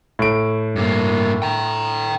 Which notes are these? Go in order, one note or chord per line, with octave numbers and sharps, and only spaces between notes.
A2 D7
G2 A#3
G5 A#5